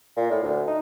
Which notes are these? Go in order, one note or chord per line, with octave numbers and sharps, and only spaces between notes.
A#2
A2
D2
D#4